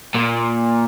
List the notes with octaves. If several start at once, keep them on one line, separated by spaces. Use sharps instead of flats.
A#2